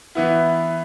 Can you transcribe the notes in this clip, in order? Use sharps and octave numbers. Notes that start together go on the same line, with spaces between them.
E3 B3 E4